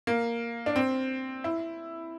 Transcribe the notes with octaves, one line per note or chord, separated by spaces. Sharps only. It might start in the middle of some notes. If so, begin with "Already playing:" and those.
A#3
D4
C4
E4